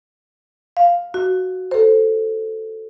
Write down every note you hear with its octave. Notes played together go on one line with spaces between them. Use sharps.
F5
F#4
A4 C5